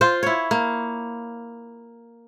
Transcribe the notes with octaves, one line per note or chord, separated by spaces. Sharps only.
F4 C5
E4 C#5
A#3